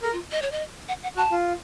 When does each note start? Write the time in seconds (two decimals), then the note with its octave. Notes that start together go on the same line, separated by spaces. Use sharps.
0.02 A4 A#4
0.13 F4
0.32 D#5
0.42 C#5
0.51 D#5
0.88 F#5
1.03 F#5
1.17 F#4 A5
1.31 F4